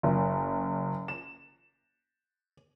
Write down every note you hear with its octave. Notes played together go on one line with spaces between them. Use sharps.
F#1
E7